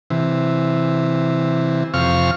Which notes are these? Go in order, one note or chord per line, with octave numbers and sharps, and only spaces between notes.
C3 E3
F2 C3 F5 C#6 F6